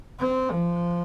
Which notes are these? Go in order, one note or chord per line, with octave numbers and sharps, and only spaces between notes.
C4
F3